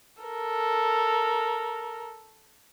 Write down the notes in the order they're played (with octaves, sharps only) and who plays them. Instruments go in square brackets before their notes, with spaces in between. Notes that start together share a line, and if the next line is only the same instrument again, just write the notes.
[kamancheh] A4 A#4